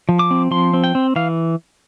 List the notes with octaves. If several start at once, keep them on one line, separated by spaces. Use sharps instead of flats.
F3
D6
C4
F3 C6
C4
G5
C4
E3 F5